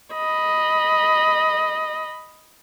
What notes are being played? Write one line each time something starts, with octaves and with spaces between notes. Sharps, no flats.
D#5 B5